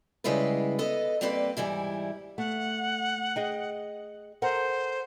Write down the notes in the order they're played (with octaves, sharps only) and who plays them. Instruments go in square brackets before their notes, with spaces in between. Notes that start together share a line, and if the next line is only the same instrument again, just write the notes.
[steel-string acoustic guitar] C#3 G3 G#3 E4 F4 B4
B3 A4 D#5
G3 A#3 C4 A4 B4 D5
G#2 E3 G3 E4
[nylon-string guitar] A3 [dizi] F#5
[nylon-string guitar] G#4 D#5 G5
[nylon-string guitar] A4 A#4 F#5 [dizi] C5